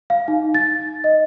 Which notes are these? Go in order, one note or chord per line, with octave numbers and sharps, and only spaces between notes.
F5
D#4
A6
D#5